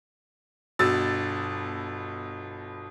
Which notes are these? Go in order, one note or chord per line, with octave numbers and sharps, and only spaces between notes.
G1 B2 E6 A6